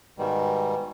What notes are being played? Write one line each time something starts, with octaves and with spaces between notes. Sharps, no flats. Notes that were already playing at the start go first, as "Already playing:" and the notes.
G#2 B2 D#3 G3